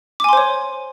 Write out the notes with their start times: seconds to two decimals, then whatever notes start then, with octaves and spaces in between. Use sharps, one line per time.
0.20 D6
0.24 G#5
0.29 C6
0.33 C5
0.37 C#5